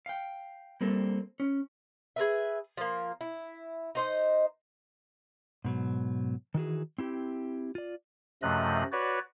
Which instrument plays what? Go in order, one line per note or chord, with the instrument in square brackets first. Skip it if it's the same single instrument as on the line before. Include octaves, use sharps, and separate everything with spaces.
[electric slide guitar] F5 G5
G3 A#3 C4 A4
C#4
[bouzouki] G#4 A#4 B4 E5
F3 A#3
E4
D#4 C5 D#5
[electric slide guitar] G#2 B2 F#3
D#3 E3 F#4 G#4
C4 E4 G4
F4 D5
[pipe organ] F#2 C3 F3 A3 D#5 F#6
F#4 B4 C#5 D5